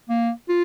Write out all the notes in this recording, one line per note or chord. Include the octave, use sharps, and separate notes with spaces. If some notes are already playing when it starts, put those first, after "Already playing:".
A#3
F4